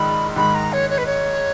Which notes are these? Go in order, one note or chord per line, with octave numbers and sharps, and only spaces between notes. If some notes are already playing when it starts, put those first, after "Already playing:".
Already playing: A#1 G#2 D#3 G#3 B5
G#2 D#3 G#3 B5
A#5
C#5
C#5
B4
C#5